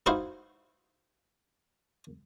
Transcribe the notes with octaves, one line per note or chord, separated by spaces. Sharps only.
D#4 E4 F#4 C5 F5